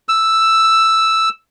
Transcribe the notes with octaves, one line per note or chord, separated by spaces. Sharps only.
E6